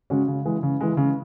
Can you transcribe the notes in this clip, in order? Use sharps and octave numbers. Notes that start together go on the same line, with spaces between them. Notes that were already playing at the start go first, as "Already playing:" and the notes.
C#3 G#3 C#4 F#4
C#3
E3 G#3
C#3
E3 G#3
C#3